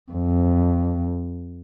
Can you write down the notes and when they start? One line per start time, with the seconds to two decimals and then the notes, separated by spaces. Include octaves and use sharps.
0.12 F2